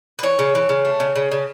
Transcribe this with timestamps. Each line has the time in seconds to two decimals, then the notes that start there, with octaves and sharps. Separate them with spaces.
0.19 B4
0.23 E3 C#5
0.39 C#3
0.55 E3
0.69 C#3
0.85 A3
1.00 C#3
1.16 C#3
1.31 C#3